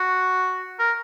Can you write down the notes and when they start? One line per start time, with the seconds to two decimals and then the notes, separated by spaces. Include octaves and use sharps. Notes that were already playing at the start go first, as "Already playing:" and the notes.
Already playing: F#4
0.79 A#4